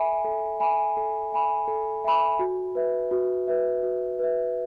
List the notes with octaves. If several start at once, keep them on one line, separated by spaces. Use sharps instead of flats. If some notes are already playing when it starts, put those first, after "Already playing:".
Already playing: A4 E5 G#5 B5
A4
E5 G#5 B5
A4
E5 G#5 B5
A4
E5 G#5 B5
F#4
B4 E5
F#4
B4 E5
F#4
B4 E5